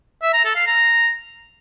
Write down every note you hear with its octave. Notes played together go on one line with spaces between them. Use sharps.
E5
A#5
A4
F5
A#5